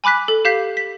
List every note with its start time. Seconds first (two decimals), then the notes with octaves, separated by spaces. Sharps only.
0.04 G#5 B5 D6 F#6 B6
0.28 A4
0.45 G4 F5 G6 B6 C7
0.77 B6